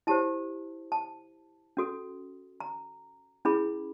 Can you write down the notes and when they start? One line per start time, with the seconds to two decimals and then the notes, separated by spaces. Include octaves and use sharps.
0.07 E4 G4 C5 A5
0.92 A5
1.77 C#4 F#4 A4
2.60 A#5
3.45 C#4 E4 G#4 B5